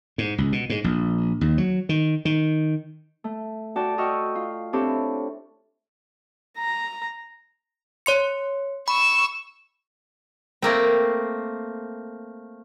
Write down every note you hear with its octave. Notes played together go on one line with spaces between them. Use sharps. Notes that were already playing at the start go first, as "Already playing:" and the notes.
G#2
C#2
B2
G#2
A#1
D#2
F#3
D#3
D#3
A3
F#4 A4 D5 G5 A5
F#4 D#5 G5 C#6 E6 F6
F4
C4 D4 E4 G4 A4 C#5
A#5
C#5 C6 C#7
B5 C#6 E6
A3 A#3 C4